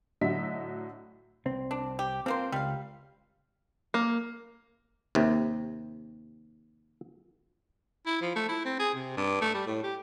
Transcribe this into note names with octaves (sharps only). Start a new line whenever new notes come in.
A2 D3 F#3 D#5 E5 B6
C2 C4
D4
G4
F3 A#3 C4 C5
C#2 G3 F5
A#3
D#2 C3
E4
F3
A3
E4
C4
G#4
C3
G2
A3
G3
A2
G4